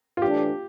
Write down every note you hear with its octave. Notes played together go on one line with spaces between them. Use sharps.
F4
A2 E3 A3 D4 G4 A4